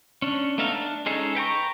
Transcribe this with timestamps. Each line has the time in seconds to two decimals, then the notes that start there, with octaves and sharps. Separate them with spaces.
0.22 C#4 D4
0.58 A3 B3 D#4 A4 F5
0.72 D4
1.06 G#3 C#4 D#4 G#4 A4
1.35 B4 G5 A#5 C#6